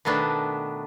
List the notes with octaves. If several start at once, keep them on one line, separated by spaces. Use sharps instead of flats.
B2 D#3 A3 B3 D4